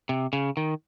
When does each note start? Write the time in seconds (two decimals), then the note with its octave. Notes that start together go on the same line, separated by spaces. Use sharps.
0.09 C3
0.33 C#3
0.57 D#3